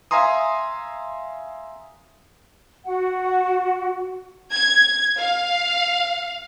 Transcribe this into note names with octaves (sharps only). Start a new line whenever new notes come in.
E5 F5 G#5 A#5 C6 D#6
F#4 F#5
G#6
F5